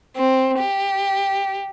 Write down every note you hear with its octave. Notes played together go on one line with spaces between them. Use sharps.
C4
G4